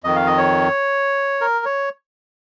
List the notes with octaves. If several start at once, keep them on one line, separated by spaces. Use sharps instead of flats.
F2 D#3 D#5
F5
D#5
C#5
A#4
C#5